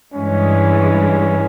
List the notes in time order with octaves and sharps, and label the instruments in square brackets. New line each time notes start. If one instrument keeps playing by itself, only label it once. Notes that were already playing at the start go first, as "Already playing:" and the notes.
[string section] G2 E3 G#3 [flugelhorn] C#4